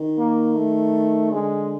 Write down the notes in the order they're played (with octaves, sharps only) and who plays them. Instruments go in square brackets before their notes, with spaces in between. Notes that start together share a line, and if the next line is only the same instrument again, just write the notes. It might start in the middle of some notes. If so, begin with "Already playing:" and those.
Already playing: [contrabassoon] D#3
[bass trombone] A#3
A3
[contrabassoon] D3 [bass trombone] G#3